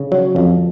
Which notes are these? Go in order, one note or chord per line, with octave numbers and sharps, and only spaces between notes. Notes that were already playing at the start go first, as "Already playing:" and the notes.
Already playing: C#3
F#3
F2